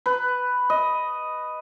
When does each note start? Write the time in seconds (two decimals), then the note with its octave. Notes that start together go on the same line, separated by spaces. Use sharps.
0.06 B4
0.70 D#5